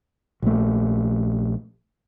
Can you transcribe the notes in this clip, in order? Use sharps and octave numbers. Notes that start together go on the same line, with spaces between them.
A#1 A3